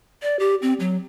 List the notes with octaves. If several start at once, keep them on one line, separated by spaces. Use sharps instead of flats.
D5
G4
C4
F#3